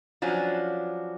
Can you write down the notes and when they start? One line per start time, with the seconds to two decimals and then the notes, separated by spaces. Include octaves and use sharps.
0.22 F3 F#3 C#4 D4